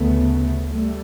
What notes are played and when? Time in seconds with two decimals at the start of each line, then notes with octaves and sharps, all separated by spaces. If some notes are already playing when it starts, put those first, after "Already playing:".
Already playing: D2 C#3 A3 B3
0.70 G3 A3